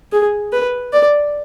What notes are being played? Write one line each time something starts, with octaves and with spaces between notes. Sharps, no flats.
G#4
B4
D5